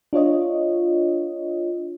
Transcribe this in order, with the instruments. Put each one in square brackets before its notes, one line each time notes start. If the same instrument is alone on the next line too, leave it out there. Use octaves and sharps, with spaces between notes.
[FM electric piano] D4 F4 C#5 D#5